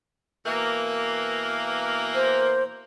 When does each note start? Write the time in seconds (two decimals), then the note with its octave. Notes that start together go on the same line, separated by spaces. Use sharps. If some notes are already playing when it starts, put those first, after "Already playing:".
0.46 B2 E3 A#3
2.15 C5